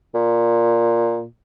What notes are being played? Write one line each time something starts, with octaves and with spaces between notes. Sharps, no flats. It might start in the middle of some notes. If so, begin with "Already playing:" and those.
A#2